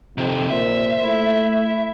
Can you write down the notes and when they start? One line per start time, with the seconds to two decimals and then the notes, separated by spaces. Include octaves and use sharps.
0.18 F2 C3 D#3
0.50 A#2 C5 E5
1.03 A3 E4